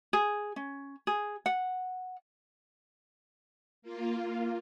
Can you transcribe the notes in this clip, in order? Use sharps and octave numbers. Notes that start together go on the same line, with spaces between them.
G#4
C#4
G#4
F#5
A#3 F4